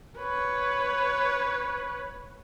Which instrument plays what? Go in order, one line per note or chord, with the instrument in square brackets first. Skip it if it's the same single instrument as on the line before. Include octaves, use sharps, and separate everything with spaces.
[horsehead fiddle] B4 C#5